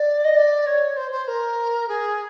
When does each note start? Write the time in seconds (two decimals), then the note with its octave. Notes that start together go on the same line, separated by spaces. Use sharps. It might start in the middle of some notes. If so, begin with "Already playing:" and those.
Already playing: D5
0.24 D#5
0.36 D5
0.66 C#5
0.96 C5
1.11 C5
1.27 A#4
1.88 G#4